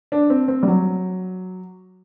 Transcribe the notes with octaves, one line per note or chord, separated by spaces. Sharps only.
D4
C4
C4
G3
F#3